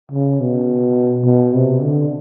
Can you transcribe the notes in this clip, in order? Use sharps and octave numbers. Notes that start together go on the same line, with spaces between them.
C#3
B2
B2
C3
D3